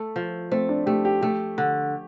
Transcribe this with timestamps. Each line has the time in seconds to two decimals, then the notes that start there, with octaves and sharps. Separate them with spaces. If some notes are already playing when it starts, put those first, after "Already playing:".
Already playing: A3 A4
0.16 F3
0.52 A3 C4
0.69 D4
0.86 A3 G4
1.05 G4
1.22 A3 G4
1.58 D3